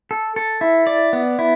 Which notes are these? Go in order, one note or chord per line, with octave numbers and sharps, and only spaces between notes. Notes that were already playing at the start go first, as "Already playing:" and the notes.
A4
A4
E4
D5
B3
E4